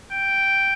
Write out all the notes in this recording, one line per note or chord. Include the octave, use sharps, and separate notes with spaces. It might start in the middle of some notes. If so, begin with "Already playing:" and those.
G5